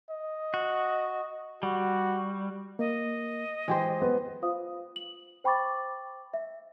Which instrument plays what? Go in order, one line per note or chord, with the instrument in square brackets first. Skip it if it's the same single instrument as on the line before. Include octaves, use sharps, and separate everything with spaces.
[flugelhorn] D#5
[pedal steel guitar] F#4
[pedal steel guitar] G3 [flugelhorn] F#4
[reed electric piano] A#3 [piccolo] D#5
[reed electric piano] E3 [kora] G#3 G4 C5
[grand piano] B3
[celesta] F4 C5 F5 D#6
F#7
C5 G5 B5 C#6 D6 A6
E5